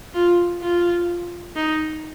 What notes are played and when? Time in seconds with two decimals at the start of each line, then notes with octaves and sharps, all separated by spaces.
0.14 F4
0.61 F4
1.56 D#4